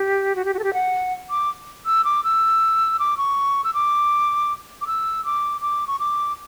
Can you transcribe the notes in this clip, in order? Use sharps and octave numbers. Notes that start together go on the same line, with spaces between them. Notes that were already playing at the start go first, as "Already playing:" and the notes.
Already playing: G4
F#4
G4
F#4
A4
G4
F#5
D6
E6
D6
E6
D6
C#6
E6
D6
D6
E6
D6
D6
C#6
D6